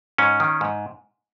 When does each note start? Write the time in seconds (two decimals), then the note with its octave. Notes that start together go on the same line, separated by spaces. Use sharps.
0.18 G#2 C#4
0.40 D#3
0.61 G#2